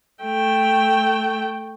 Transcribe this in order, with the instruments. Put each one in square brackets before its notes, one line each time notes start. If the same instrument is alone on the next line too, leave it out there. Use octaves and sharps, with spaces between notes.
[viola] A3 G5